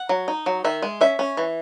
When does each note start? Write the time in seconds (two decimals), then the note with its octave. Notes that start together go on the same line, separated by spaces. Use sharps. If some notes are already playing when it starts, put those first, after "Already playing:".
Already playing: F#5
0.09 F#3
0.28 D#4
0.46 F#3
0.64 D#3 E5
0.82 G#3
1.01 C#4 E5
1.19 C#4
1.37 E3